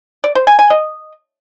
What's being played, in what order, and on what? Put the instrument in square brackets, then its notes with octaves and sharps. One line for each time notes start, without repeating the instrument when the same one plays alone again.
[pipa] D5
C5
G#5
G#5
D#5